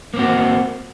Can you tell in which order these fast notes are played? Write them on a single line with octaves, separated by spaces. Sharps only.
A#3 C4 F#4